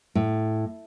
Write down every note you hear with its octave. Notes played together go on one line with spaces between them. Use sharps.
A2